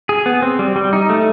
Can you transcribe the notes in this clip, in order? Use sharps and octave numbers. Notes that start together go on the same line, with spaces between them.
G#4
B3
C4
G3
G3
D#4
A3